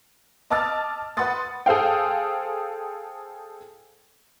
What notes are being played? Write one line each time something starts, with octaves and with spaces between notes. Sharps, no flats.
D#5 A5 D6 E6 F6 A6
B4 F#5 B5 C6 D#6 A6
G#4 A4 C5 F5 G5